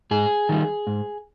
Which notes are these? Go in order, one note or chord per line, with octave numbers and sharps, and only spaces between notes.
G#2 G#4
D#3 G3
G#2